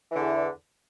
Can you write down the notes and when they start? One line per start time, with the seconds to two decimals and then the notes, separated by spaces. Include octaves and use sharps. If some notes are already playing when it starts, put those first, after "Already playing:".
0.11 E3
0.15 D3
0.18 E2